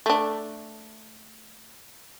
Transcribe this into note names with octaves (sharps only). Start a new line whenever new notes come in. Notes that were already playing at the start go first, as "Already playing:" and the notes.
A3 D4